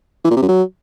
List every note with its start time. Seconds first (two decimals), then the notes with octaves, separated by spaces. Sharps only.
0.25 E3
0.30 A#2
0.36 C3
0.42 F#2
0.48 F#3